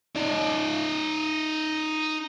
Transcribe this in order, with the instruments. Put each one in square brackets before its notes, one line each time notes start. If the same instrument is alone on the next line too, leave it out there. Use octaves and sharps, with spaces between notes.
[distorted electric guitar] D#4 D5